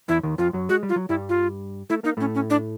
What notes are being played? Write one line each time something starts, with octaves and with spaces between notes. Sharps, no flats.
E2 E3 E4
D#2 D#3
F2 F3 F4
F#2 F#3
G#3 F#4
G3
F4
F#3
G2 G3 E4
F4
A3 E4
A#3 D#4
A2 A3 C#4
C#4
D4